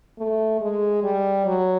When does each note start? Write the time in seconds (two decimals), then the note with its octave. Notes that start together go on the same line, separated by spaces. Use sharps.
0.18 A3
0.61 G#3
1.03 G3
1.46 F#3